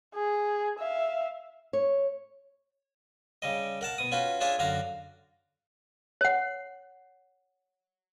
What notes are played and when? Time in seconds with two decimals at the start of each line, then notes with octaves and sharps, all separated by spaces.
0.15 G#4
0.79 E5 F5
1.73 C#5
3.42 C#3 G3 D#5
3.81 A#4 F#5 A5
3.98 B2 D#6
4.12 C#4 F4 F#4 B4
4.41 D4 F4 G#4 C#5 D5 E5
4.59 F#2 D3 F#4 F5 A#5
6.21 C#5 F#5